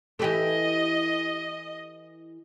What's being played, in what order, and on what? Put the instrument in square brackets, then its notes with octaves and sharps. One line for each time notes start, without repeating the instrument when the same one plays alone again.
[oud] E3 G4 A4 [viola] D#5